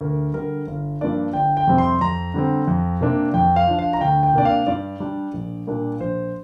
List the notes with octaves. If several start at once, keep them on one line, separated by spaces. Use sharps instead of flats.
D2 A#4
D3 G3 A#4
G1
G2 F3 A#3 D4 D5
G1 G5
G5
F2 C3 G3 C4
C6
F2 A#5
D3 G3 C4
F2
C3 A#3 D4
F2 G5
F5
F3 D4
F5
A#5
D2 G5
G5
C3 A#3 D4 D5
F5
G2 D5
G3 D4
A#1
A#2 G3 A#3 D4
A#1 C5